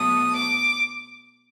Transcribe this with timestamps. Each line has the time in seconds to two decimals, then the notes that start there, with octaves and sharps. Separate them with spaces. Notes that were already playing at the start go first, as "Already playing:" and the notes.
Already playing: B2 F#3 A3 D#6
0.34 D6